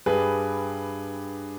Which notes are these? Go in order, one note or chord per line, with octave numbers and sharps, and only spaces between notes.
G2 G3 G#4 B4